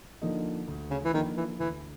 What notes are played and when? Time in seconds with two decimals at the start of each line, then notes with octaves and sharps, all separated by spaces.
0.22 D3 F3 A#3 D#4
0.68 D2
0.90 C#3
1.04 E3
1.14 D3 D#3 F3 A#3 D#4
1.37 E3
1.59 D2 E3